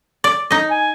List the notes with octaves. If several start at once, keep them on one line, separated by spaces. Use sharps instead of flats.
D5
D#4 D#5
G#5